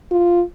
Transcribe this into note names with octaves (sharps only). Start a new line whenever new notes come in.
F4